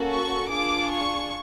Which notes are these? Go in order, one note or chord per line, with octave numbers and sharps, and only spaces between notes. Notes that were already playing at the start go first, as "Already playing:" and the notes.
Already playing: A#3 C#4 F#4 A4
C#6
D4 F4 G#4 D6
C#6